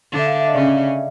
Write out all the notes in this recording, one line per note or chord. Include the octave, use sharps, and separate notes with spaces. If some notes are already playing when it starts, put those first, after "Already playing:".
D3 D4
E5
F5
E5
D#5
C#3 C#4 D5